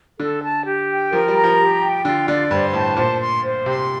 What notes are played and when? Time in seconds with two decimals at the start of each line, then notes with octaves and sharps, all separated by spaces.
0.19 D3 A4
0.43 A5
0.66 G4
0.90 G5
1.12 F3 A#4
1.28 G3
1.35 A#5
1.44 F3
1.59 G4
1.82 G5
2.05 D3 F4
2.28 D3 D5
2.51 G2 C5
2.73 A2 A5
2.97 A#2 C5
3.20 C6
3.43 C5
3.66 C3 C6